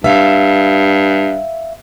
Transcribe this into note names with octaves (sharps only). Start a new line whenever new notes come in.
G2 E5 F5